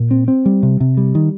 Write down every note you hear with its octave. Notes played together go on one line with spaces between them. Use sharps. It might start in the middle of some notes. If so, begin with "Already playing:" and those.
Already playing: A#2
C4
C4
G3
C3
C3
G3
D#3